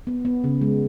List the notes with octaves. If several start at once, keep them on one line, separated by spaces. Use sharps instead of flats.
B3
B3
C#3
G#3